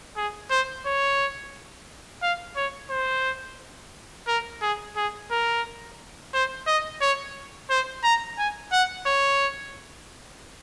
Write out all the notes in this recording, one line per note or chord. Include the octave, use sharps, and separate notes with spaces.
G#4
C5
C#5
F5
C#5
C5
A#4
G#4
G#4
A#4
C5
D#5
C#5
C5
A#5
G#5
F#5
C#5